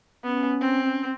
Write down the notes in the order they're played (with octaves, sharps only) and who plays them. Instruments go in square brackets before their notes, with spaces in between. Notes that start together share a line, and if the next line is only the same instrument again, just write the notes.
[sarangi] B3 [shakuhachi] C#4
[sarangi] C4